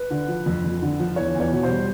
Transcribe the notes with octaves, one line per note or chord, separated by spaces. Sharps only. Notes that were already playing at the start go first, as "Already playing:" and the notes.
Already playing: B4
D3
F3
F2
F2
D3
F3
E2 C#5
E2
C#5
B2
C5
G3